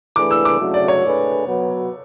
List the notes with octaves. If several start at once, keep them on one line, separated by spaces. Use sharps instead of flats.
E3 A3 D4 G#4 B4 D6
E6
D6
C#3 F#3 A3 D4 F#4
D5
C#5
A3 D4 G#4 B4
B2 F#3 B3 F#4 B4